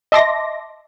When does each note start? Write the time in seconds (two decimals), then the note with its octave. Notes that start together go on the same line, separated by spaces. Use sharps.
0.12 D#5 E5 A5 C6 D6 A#6